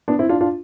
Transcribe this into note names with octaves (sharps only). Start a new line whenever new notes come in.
B3 D4
C4 E4
D4 F4
D4 F4